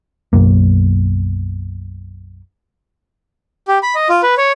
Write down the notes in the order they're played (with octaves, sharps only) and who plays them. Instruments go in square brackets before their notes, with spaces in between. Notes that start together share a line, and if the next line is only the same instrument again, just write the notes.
[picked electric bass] B1 F#2 A#3
[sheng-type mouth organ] G4
B5
D#5
F4
B4
C#5